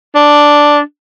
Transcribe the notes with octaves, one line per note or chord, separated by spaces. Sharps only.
D4